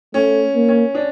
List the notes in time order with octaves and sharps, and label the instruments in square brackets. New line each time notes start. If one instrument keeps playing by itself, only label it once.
[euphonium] A3 [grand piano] C#4
[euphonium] A#3
[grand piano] C#4
D4